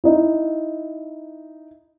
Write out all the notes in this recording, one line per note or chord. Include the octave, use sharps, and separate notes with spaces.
D#4 E4